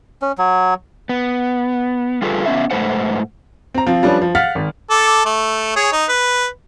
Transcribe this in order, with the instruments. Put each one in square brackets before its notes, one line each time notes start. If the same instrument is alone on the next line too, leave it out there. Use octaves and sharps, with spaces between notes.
[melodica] C#4
F#3
[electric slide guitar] B3
G3 F4 G#4 A4 B4
B3 C#4 E5
G#2 C3 A3 B4 C5 F#5
[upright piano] C4 A#5
F3 C4 F4
F3 G3 C#4 D4 B4
F3
F5 F#5 F6 A6 B6
G#1
[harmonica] A4 D6
A3
G#4 C#5
D#4
B4